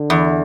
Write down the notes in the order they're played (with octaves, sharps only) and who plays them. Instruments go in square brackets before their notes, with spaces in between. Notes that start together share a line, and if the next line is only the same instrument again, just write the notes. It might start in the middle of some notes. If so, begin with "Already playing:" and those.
Already playing: [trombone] D3
[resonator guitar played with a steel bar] E2